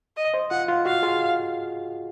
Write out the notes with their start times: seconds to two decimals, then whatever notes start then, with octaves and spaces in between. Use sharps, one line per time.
0.17 D#5
0.34 C5 D#5
0.50 F4 F#5
0.68 F4
0.86 F#4 F5
1.03 F4 G#4